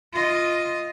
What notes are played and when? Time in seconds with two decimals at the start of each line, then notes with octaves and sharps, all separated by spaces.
0.13 F4 D#5